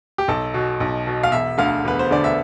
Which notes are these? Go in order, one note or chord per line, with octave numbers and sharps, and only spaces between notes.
G4
B1 A4
B2
B1
B2
F5
E1 E5
D2 D3 F5
E1 B4
C5
D2 D3 D5
E5